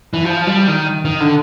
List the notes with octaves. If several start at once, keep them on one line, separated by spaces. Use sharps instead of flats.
E3
F3
G3
D#3
D#3
D3